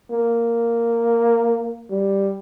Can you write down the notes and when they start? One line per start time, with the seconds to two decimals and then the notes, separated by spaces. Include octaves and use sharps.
0.11 A#3
1.90 G3